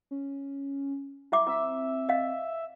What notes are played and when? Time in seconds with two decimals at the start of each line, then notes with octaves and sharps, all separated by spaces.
0.11 C#4
1.32 E4 E5 D6
1.47 C4 E4 E5
2.09 D#5 F5